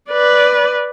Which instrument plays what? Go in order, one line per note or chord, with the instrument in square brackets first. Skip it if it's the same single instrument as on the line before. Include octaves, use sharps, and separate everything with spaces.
[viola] B4 D5